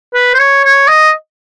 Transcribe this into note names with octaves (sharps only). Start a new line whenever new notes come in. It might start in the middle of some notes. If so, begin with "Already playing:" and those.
B4
C5
C#5
C#5
D#5